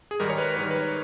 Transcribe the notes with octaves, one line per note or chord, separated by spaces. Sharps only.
G#4
G#2 D#3 G3 A#4
C#5
B4
G#2 D#3 G3 B4
B4
C#5